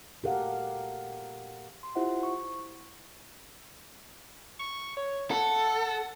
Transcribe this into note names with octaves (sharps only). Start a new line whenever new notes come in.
A#2 G4 A4 A#4 F5 F#5
C6
E4 F4 G4 C5 E5 F#5
C#6
C#6
C#5
A4 F#5